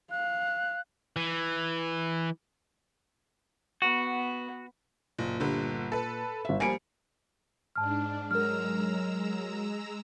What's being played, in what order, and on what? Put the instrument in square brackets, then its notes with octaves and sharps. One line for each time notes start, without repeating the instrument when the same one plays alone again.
[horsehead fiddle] F5 [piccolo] F#6
[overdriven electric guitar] E3
[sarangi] B3 [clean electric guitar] F#4
[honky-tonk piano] F#1 [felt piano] A#2
[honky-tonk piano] G1 D3 G3
A4 B4
[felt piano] G1 E5
[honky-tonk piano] F3 G3 A#3 [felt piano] G#5 C#7 D7
[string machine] G#2 D4 [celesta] A5 F6
[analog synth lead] F#3 [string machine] G#3 A#5 E6 [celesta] A#4 F6